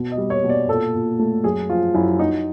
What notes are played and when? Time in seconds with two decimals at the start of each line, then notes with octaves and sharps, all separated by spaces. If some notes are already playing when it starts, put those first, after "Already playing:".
Already playing: B2
0.12 D#5
0.18 G3
0.30 C#5
0.44 B2
0.49 D5
0.68 A#2 A4
0.94 A#2
1.19 A3
1.44 F#2 G#4
1.70 F3 F4
1.95 F#2 E4
2.19 F#3 D#4